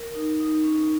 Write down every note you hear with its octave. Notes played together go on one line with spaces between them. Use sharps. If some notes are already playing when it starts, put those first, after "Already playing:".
Already playing: A#4
D#4
D#4
C#4